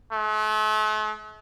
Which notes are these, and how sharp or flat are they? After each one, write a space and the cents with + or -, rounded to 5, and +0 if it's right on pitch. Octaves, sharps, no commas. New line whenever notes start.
A3 -45